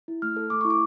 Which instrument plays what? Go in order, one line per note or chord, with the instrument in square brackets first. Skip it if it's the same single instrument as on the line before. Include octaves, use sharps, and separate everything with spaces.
[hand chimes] E4
A3 F6
A4
A3 D6
E4 C#6
D6